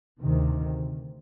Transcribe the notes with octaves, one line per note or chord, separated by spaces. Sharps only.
D2 C3 D#3